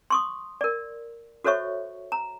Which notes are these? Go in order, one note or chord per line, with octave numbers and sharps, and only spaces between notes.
C6 C#6 D#6
A#4 D5
F#4 A4 C5 C#5 E5 C#6
A#5